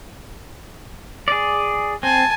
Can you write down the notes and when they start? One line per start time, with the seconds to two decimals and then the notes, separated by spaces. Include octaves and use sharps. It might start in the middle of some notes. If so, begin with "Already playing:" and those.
1.28 G#4 D5
2.03 C4 G#5 A5